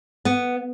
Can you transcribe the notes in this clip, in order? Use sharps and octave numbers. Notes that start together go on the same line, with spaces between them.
B3